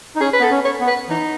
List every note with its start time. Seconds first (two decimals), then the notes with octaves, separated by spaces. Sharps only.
0.16 D#4
0.20 C#4 G#4
0.33 B4
0.40 B3 A4
0.51 C#4
0.65 C#5
0.80 B3
0.87 B4
1.09 E3 D#4